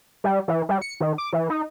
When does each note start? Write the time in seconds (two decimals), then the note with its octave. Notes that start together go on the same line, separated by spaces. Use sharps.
0.24 G3
0.48 E3
0.69 G3
0.82 C#7
1.00 D#3
1.18 D6
1.33 E3
1.50 D#4